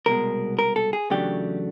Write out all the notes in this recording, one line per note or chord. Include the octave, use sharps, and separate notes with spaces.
C2 B2 G#3 A#4
A#4
A4
G#4
E2 C#3 F#3 A3 D4 G4